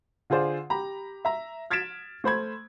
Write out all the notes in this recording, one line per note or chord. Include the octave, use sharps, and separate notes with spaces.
D3 F4 G#4 C5 D5
G4 A#5 B5
E5 A#5
F6 G#6 A6 B6 D7 E7
A3 C5 B5 G#6